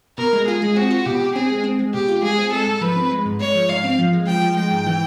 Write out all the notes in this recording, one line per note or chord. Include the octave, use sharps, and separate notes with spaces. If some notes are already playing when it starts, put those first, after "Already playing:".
B2 A#4
G#3
F4 G#4
G#3
C4 F#4
F4
B2 G4
B2
C4 G#4
G#3
C4
G#3
B2 G4
F4
G#3 G#4
C4
G#3 A4
G#2
F3 B4
C4
G#3
G#2
G#3 C#5
F3
G#2 F5
C4
F3
G#3
F3 G5
F3
G#3 G5
G#2
E3